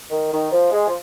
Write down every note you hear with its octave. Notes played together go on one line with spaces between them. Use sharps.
D#3
D#3
F3
G#3
F3